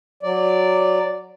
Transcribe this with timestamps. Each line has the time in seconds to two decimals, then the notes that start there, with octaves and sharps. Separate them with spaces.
0.23 F#3 D5